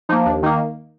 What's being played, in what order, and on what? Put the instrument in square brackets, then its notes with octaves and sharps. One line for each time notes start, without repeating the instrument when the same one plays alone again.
[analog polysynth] F3 A#3 D#4
D#2 D4
D#3 D#4
A#3